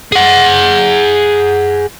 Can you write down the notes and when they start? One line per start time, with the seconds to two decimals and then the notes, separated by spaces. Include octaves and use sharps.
0.12 G#4 F#5